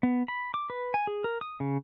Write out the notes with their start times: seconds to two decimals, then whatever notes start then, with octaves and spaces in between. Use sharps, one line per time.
0.03 B3
0.28 B5
0.54 D6
0.70 B4
0.94 G#5
1.07 G#4
1.24 A#4
1.41 D#6
1.60 C#3